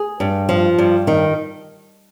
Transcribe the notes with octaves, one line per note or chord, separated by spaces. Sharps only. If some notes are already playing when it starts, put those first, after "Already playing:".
Already playing: G#4
G2
F3
G2
D#3